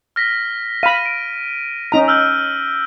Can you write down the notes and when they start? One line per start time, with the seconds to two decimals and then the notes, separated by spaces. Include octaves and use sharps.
0.16 F6 A#6 B6
0.83 F5 B5 D#7
1.06 D7
1.92 C#4 D#4 A#5
2.08 E6 F6 G6